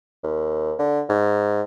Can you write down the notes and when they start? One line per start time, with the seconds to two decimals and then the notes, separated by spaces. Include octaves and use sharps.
0.23 D#2
0.79 D3
1.09 G#2